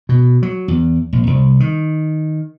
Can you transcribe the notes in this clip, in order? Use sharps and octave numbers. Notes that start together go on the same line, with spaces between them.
B2
F#3
E2
A#1
C2
D#3